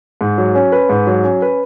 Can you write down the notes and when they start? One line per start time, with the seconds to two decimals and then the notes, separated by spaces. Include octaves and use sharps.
0.21 G#2
0.38 F#3
0.55 C#4
0.72 B4
0.89 G#2
1.07 F#3
1.24 C#4
1.42 B4